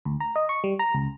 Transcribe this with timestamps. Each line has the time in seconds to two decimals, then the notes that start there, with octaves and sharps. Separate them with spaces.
0.05 D2
0.20 A#5
0.36 D#5
0.49 C#6
0.64 G3
0.79 A#5
0.94 C#2